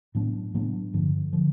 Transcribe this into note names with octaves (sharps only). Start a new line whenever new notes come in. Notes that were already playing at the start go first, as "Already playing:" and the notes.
A2 F#3 B3 D4
A2 F#3 B3 D4
G2 D3 F3
D3 F3